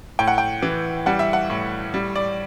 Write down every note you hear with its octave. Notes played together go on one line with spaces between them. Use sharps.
A2 G5
F#5
G5
E3
G3 F#5
E5
F#5
A2
G3
D5